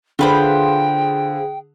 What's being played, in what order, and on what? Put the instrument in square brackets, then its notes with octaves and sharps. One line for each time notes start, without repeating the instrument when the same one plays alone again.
[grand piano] D3 [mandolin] F4 B4 C5 [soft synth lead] G#4 [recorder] G5